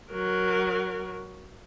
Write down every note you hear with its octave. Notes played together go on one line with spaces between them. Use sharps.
F#3 A#4